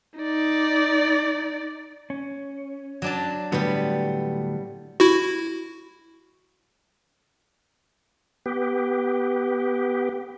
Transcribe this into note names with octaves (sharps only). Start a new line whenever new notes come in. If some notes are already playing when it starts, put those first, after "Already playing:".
D#4 D5
C#4
F#3 D4 A5
A2 D3 F#3 G3 B3
E4 F#4
B3 G4